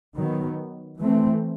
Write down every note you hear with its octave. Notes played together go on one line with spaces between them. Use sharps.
D#3 F#3 B3
E3 A3 C4